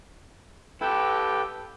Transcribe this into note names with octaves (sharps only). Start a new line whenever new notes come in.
E4 G4 A4 B4 G5